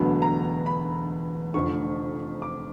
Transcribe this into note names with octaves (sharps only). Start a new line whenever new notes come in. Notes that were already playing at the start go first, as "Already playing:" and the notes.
Already playing: E1 D2 D3 F#3 B3 B5
A#5
B5
F1 F2 D3 C#6
D6